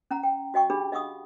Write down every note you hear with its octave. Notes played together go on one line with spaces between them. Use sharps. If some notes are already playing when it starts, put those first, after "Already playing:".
C#4 F#5 A#5
G5
F#4 D#5 G5 C#6
D4 G4 G#4 B5
D#5 F5 F#5 C#6 D#6